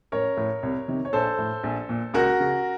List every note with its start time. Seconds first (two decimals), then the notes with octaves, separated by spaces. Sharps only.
0.12 A1 A#4 C#5
0.37 A2
0.63 C2
0.88 C3 D#3
1.05 C#5
1.13 A#1 A4 C5
1.38 A2
1.64 A#1
1.89 A#2
2.14 C#2 F#4 A#4
2.40 C#3